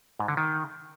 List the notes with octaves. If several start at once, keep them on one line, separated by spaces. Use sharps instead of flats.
G#2
D3
D#3